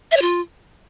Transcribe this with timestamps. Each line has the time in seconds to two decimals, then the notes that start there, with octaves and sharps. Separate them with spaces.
0.11 E5
0.17 C#5
0.22 F4